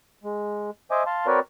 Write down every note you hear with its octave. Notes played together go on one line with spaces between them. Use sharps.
G#3
C5 D#5 E5 G#5 D6
F5 A5 C6
C4 F#4 A#4 B4 C#5 D5